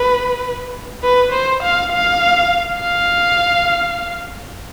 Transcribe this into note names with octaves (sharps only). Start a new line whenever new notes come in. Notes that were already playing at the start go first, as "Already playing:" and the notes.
Already playing: B4
B4
C5
F5
F5
F5